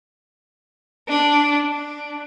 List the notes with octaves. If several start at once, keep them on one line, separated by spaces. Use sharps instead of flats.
D4
D4